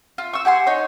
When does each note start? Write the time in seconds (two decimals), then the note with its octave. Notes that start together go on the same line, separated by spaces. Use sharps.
0.18 F4
0.33 C#6 E6
0.45 G4 F#5 G#5 C6
0.67 D#4 C#5